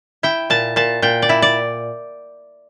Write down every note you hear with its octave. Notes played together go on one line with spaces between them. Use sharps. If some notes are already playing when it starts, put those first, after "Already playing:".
E4 G5
A#2 A5
A#2 A5
A#2 G5
D5
E4
D5